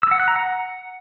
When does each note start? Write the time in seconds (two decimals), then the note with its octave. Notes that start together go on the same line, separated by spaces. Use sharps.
0.03 E6
0.11 F#5
0.20 F#6
0.28 A#5
0.36 F#5